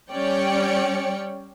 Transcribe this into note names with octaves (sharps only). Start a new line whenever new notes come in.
G3 C#4 C#5 D5 G5 C#7